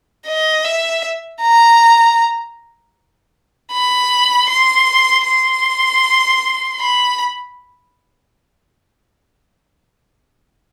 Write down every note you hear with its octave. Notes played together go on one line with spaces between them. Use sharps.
D#5
E5
A#5
B5
C6
C6
B5